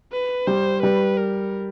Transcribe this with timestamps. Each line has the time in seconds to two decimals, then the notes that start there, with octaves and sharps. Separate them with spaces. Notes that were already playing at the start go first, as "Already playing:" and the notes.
0.12 B4
0.47 G3 C5
0.83 G3 B4
1.18 A#4